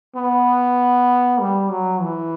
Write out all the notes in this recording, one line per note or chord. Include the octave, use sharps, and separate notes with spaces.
B3
G3
F#3
E3